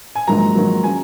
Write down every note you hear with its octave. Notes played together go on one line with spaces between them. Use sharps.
G#5
A#1 G#2 D#3 F#3 A#5
A#1 G#2 D#3 F#3
C#3 F#3 G#5